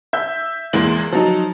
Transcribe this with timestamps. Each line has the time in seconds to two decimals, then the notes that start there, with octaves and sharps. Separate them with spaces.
0.13 E5 G6
0.73 E2 A#2 G#3 A#3 E4 F#7
1.12 F3 F#3 D#4